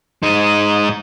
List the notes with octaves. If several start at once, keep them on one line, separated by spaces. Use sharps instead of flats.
G#2 D#4